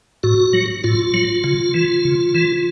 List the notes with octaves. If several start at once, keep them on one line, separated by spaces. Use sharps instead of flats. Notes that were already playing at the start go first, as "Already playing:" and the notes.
A2 F#4
F#3
A2 F4
F#3
C#3
E3
C#3
E3